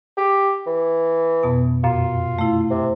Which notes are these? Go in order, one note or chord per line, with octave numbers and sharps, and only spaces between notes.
G4
E3
F2 B2 B3
F#2 A#2 F4
A3 E4
C3